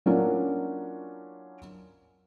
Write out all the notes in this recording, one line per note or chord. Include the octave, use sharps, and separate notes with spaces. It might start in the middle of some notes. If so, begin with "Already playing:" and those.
F#3 A#3 C#4 D4 E4 F4